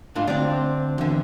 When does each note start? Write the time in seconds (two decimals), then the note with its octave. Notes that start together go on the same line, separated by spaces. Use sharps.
0.15 G#2 D4 F4
0.27 D2 C4 D4
0.98 E2 D3